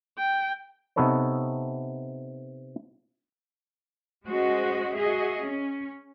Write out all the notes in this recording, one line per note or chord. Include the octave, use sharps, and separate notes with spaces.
G5
C3 B3 D#4 A4 B4 C#5
G#3 C#4 F#4 C5 D#5
F#4 G#4 D#5 E5
C#4